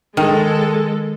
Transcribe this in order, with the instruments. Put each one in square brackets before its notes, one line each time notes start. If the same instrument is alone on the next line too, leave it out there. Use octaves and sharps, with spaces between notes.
[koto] D#3 [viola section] G#3 A4